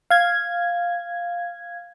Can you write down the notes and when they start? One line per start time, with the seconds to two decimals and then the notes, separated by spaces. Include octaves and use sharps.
0.10 F5 G#6